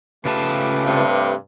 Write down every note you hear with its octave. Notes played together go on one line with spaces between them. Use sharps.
C#3 A3 F4 G4 B4 A5
G2 C3